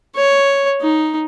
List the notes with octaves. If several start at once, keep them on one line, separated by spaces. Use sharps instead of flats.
C#5
D#4